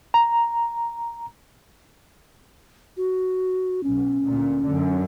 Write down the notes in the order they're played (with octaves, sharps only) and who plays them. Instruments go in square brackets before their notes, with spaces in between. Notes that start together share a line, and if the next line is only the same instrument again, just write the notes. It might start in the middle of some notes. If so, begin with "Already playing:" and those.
[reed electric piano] A#5
[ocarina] F#4
[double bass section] B1 [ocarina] C#4
[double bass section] D2 A#2
F#2 D3